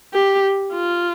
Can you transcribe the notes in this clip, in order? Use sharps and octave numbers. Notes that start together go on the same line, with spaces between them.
G4
F4